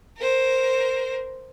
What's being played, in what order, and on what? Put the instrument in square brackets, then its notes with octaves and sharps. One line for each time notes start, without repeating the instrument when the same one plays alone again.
[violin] A#4 C5